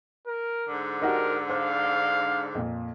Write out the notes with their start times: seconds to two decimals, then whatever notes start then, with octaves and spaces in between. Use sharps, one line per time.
0.27 A#4
0.68 G#2 D3 D4
1.02 D#4 F#4 G4 A#4
1.49 C5 F5
2.55 F2 A#2